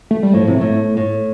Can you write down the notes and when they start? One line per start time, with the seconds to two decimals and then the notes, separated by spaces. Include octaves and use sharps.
0.11 A3
0.23 G3
0.34 A2 F3
0.48 C3
0.55 A3
0.61 A2
0.97 A2